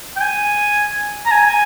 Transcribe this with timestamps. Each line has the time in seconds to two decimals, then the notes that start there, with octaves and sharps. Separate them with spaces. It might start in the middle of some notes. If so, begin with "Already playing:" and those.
0.16 G5
0.21 G#5
1.26 A#5
1.31 G#5
1.49 G#5